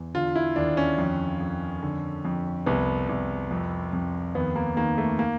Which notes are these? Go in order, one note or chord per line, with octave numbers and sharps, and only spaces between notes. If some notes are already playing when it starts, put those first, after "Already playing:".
Already playing: E2
D3 F4
E4
D#2 D4
C#4
F2
F2
D3
F2
C2 B3
C2
F2
F2
D#2 B3
A#3
D#3 A#3
A3
A#3